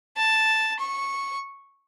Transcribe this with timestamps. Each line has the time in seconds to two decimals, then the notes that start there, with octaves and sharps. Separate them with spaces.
0.17 A5
0.80 C#6